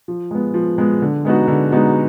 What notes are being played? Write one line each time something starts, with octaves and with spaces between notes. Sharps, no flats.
F3
G#3 B3
F3
G#3 B3
D3
G#3 B3 D#4 F#4
D3
G#3 B3 D#4 F#4